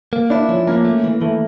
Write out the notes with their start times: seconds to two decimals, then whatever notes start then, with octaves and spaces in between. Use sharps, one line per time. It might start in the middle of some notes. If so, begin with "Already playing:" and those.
0.13 A#3
0.30 D4 E4
0.49 F3 C#4
0.67 A#3 C#4
0.85 A3
1.04 E3
1.21 E3 A3